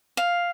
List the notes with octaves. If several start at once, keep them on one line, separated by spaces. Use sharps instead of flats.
F5